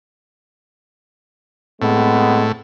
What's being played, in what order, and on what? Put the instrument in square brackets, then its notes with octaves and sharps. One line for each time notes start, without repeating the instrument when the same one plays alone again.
[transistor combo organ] A2 [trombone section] G#3 B3 C4